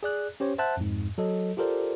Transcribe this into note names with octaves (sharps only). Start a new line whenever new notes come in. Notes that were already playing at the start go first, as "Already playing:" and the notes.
G#4 D5 F#6
C#4 G4 C5 C#5
C5 E5 F#5 A5 F#6
F2 G#2
F#3 A4 D#5
F4 G4 A4 A#4 C5 D5